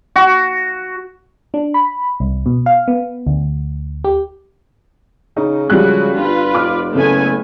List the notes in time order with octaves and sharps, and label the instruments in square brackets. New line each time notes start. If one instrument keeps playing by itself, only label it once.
[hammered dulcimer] F#4
[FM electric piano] D4
B5
C2
B2
F5
B3
D2
G4
[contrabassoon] C#3 [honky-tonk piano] D#4
[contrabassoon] C#3 [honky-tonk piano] F3 G3 F#6 [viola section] G#3 F#4
[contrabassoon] G1 [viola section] F4 B4
[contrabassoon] F1 [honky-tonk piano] D6 F6
[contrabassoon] F#1 [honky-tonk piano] C#3 [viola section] A3 B3 G#5